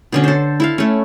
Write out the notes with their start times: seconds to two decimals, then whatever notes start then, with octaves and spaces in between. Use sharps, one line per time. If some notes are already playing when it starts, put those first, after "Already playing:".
0.12 B2 D3 C#4
0.24 A4 C5
0.60 E4 A4 F5
0.78 A3 C#4